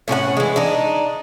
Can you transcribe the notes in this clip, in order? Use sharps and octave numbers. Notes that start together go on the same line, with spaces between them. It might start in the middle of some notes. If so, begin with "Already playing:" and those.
A2 C#4 F4 F#5
E3 G#3
D4 D#4